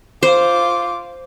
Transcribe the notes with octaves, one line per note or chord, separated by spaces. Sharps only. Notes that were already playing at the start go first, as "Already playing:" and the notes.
F4 C5 D6